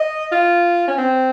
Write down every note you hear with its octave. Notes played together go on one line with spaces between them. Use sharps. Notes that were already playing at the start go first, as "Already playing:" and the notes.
Already playing: D#5
F4
C#4
C4